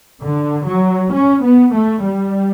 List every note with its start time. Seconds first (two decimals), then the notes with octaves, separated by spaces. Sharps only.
0.23 D3
0.68 F#3
1.13 C#4
1.43 B3
1.74 A3
2.05 G3